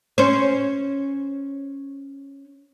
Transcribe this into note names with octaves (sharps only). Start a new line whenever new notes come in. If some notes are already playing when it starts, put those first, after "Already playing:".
C#4 C5